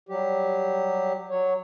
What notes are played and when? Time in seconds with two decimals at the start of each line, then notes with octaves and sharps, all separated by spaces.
0.09 F#3 G3 G4
1.30 F#3 C#5